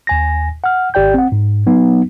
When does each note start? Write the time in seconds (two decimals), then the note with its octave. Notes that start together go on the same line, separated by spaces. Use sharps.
0.07 D#2 G#5 A#6
0.64 F#5 F6
0.94 G#1 G4 D5 G5 G6
1.14 C4 F#5
1.32 G#2
1.66 F#3 B3 D#4